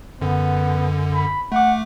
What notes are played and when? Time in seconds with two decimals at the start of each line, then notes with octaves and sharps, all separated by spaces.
0.21 F#2 D3 B3
1.13 B5
1.52 A3 F#5 D6